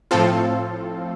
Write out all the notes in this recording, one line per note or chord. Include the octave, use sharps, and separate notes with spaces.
A2 F3 C4 F4 A4